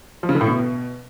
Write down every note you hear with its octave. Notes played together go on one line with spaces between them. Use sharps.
F3
C#3
D3
A2
B2